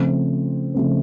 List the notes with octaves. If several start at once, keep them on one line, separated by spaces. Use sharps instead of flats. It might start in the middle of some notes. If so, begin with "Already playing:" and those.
Already playing: C#3 F3 A3 C4
C#3 F3 A3 C4